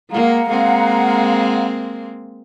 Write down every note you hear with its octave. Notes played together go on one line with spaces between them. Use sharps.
G#3 A#3 F5 F#5 A#5
G#3 A#3 C4